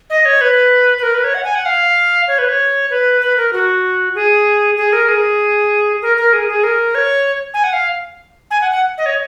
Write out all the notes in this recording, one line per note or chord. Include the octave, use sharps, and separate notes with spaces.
D#5
C#5
B4
B4
A#4
B4
C#5
F#5
G#5
F#5
F5
C#5
B4
C#5
B4
B4
A#4
F#4
G#4
G#4
A#4
G#4
A#4
A#4
G#4
G#4
A#4
C#5
G#5
F#5
F5
G#5
F#5
F#5
D#5
C#5